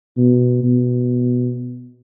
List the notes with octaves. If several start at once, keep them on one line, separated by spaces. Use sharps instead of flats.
B2
B2